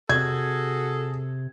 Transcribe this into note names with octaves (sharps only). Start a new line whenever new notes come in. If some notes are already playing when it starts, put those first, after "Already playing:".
C3 F#4 G#4 A4 G#6